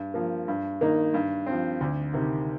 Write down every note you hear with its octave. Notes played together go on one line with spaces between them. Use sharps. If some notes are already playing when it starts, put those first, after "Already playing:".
Already playing: G2
F3 A#3
G2
D#3 A#3 D#4
G2
F3 C4
D2
C3 D#3